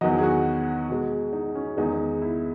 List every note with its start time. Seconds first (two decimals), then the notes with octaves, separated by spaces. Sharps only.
0.01 E2 D#3 F#3 D#5
0.18 G#4
0.23 F#4
0.89 B2 G#3
1.33 D#4
1.55 C#4
1.77 E2 D#3 G#3 D#4
2.22 E4